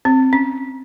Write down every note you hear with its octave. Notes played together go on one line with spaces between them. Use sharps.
C4
C#4